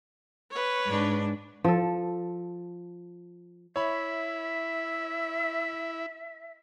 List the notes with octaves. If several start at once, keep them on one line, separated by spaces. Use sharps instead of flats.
B4 C#5
G#2 D4
F3 A4
E4 C#5 E5 B5